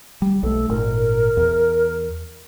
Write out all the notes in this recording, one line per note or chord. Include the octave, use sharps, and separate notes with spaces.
G3
B1 A3 A4
G#1 A#2 A#4
E2